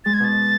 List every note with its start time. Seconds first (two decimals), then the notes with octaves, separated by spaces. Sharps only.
0.05 G#3 A6
0.14 G#6
0.20 B2 A6